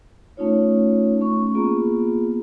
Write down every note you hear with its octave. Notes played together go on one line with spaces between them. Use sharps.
A3 C#4 D#4 F4 C#5
A3 C#4 C#6
A#3 B3 F4 G#4